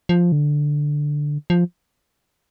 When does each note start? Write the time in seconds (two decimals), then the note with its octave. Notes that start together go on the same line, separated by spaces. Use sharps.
0.09 F3
0.32 D3
1.50 F3